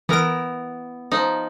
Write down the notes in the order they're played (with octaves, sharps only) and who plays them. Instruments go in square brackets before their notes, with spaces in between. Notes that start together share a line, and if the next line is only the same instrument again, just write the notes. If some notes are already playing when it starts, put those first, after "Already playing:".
[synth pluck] E3 A#4 D7 [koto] B3 E4 A#5
[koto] F3 D#4